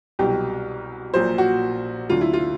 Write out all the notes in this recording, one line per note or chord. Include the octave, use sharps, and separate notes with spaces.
C2 B2 F#3 G4
A#1 A#2 F#3 C5
F#4
D2 D3 F#3 F4
E4
F4